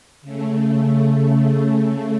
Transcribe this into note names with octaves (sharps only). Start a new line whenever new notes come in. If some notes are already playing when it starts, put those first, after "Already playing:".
C#3 A3